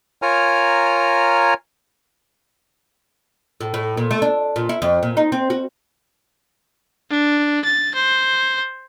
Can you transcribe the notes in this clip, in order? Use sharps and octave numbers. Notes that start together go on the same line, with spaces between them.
F4 A#4 C#5 G#5 A#5 F6
A2
A2
A#2
A3
D4
A#2
E4
F2
A#2
D#4
C4
F#4
D4
A6
C5